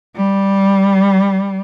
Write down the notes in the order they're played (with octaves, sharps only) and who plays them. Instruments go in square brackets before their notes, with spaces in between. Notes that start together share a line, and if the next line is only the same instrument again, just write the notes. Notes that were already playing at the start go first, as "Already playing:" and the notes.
[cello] G3